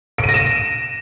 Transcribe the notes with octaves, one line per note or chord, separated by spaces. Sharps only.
D7
D#7
A#6
E7